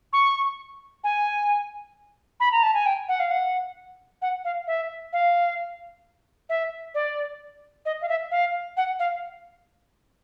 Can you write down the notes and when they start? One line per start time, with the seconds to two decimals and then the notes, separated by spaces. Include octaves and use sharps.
0.13 C#6
1.04 G#5
2.40 B5
2.52 A#5
2.63 A5
2.74 G#5
2.86 G5
3.08 F#5
3.20 F5
3.31 F#5
4.22 F#5
4.45 F5
4.67 E5
5.13 F5
6.49 E5
6.94 D5
7.85 D#5
8.02 F5
8.09 E5
8.31 F5
8.77 F#5
8.99 F5